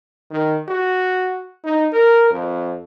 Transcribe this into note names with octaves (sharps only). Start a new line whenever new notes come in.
D#3
F#4
D#4
A#4
F2